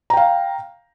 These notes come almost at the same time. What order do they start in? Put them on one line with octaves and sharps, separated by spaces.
A#5 G5 F5